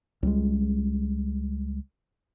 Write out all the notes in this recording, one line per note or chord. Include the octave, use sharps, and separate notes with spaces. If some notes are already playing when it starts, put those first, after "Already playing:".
C#2 G3 G#3